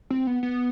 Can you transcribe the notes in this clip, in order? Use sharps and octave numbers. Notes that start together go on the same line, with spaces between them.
C4
B3
B3